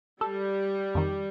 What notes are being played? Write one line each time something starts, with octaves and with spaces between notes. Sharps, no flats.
G3 A4
F2 D#3